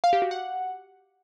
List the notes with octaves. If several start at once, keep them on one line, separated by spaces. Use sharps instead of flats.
F5
G4
F#4
F#5